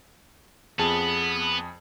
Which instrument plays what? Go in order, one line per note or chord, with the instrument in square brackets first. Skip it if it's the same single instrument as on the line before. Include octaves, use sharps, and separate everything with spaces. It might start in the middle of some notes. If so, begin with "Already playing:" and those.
[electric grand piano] F2 G#4 A5 [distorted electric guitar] B3